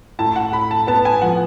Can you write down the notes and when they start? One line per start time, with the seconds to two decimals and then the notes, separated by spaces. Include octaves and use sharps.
0.19 A2 A5
0.36 F#5
0.52 A2 B5
0.71 A5
0.87 B3 A5
1.05 G#5
1.22 F3 F#5